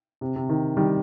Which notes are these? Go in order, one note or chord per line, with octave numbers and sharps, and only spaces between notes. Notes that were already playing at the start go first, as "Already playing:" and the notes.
C3
C3
D#3
D#3 G3